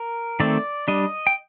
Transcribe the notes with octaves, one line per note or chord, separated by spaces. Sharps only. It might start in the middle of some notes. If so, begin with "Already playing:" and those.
Already playing: A#4
D#3 A3 C4 D5
G3 D4 D#5
G5